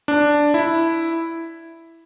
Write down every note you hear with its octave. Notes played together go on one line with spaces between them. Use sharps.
D4
E4